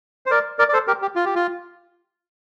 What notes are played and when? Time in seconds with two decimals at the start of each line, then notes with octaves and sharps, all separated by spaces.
0.26 C5
0.31 A#4 D5
0.59 A#4 D5
0.69 D5
0.73 A4 C5
0.87 G4 A#4
1.02 G4
1.16 F4
1.25 G4
1.35 F4